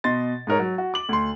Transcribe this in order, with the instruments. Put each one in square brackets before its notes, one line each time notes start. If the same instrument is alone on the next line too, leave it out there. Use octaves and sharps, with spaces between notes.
[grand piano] B2 D#5 C6 A6
G#2 D#4 A#4 C#5
F#3
F#4
D6 F#7
D2 C6